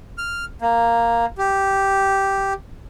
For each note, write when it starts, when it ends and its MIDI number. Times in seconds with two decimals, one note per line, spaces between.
0.18 0.45 89
0.62 1.26 58
1.38 2.53 67